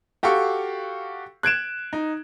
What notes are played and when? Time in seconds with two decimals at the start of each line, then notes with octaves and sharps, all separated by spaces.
0.23 F#4 G4 A4 F5 C#6
1.43 F#6 G#6 D7 E7
1.93 D#4